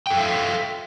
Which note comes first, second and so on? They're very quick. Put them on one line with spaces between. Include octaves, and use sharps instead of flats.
G5 A4 F5 E5